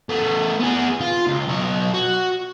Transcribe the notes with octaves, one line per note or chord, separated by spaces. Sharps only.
A3 B3
B3 G#4
F4
C#2
B1 C#5
F#4